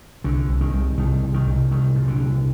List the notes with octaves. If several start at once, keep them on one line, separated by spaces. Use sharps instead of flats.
C2 D3
C2
D#3
C2
C2 D#3
C3
D#3
C2
C2 D#3
A#2
D3
C2